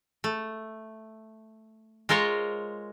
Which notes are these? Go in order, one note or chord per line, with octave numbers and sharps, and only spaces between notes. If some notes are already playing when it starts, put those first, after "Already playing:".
A3
G#3 F4 A#4 C5 C#5